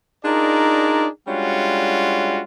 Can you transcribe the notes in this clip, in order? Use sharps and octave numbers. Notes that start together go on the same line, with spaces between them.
D4 D#4 F4 G#4 A#4 D5
G3 G#3 C#4 D4 F4 F#4